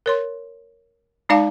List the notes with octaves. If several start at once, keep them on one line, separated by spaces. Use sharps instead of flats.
A#4 C#5 C6
G#3 D#4 D5 F5 A5 D6